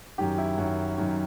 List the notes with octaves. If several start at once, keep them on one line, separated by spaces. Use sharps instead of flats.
F#2 D#3 G4
E4
F#2 D#3
F#2 D#3